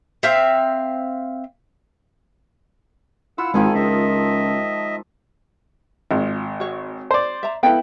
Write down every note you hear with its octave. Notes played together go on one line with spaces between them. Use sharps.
C4 E5 F5
E4 F4 F#5 E6
G#1 D#3 F3 G#3 A4 G#5
C#2 D#5 E5
G#1 F4
F#4 C#5
C5 D5
E5 A#5
B3 E4 A4 F5 G5